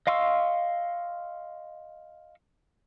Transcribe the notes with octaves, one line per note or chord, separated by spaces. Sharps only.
D#5 F5 C6 C#6 E6